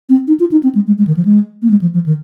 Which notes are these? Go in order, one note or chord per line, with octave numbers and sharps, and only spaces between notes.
C4
D#4
F4
D#4
C4
G#3
G#3
G#3
D#3
F3
G#3
A#3
G#3
F3
F3
D#3